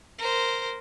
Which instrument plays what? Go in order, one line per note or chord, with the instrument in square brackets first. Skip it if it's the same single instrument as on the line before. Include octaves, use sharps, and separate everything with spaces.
[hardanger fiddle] A#4 C5